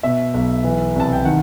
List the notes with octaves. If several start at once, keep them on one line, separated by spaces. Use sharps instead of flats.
B2 E5
B1
E3
C2 A5
G5
D#3 F#5